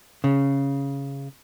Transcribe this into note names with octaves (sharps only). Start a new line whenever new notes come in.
C#3